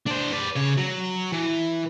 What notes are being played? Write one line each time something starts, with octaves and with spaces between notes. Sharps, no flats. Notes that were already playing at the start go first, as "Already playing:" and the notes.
D4 C5
B4 D5
C#3 C#5
F#3
E3